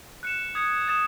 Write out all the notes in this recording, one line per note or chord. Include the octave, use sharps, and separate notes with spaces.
F#6 C#7 E7
D#6 G#6 C#7
D#6 A6 E7